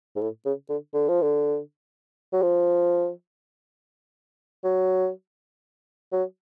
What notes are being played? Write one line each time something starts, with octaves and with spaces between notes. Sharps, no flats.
G#2
A2
C#3
D3
D3
F3
D3
F#3
F3
F#3
F#3